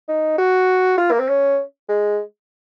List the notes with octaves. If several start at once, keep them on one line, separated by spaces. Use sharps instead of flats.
D#4
F#4
F4
A#3
C4
C#4
G#3